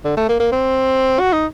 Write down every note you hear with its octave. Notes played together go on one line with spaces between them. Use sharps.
D3
A3
A#3
A#3
C4
F#4
D#4